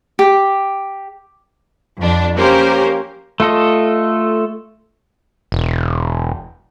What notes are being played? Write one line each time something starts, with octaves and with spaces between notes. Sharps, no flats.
G4
F2 D4
A#3 C#4 G4 A#4 C5
A3 F4 A4 D#5
E1